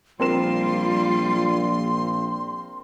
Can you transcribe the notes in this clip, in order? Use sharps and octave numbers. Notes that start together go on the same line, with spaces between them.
A#1 G3 C4 F4 A#4 C6 E7